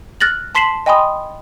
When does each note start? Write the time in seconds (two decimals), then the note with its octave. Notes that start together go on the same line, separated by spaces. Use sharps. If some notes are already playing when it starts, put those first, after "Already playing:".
0.20 F6 F#6 A6 A#6 F#7
0.55 A5 C6 B6 C7 E7 F#7
0.86 D#5 G5 G#5 B5 C6 D#6